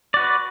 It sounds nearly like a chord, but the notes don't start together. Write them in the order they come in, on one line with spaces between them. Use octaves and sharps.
D5 F#4 B4